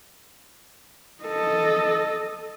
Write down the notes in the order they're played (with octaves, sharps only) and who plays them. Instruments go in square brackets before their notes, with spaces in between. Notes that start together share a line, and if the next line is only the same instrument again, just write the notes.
[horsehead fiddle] A4 D#5